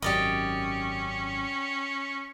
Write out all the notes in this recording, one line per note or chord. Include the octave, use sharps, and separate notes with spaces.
G#1 F#2 C#4 G4 D5 D#5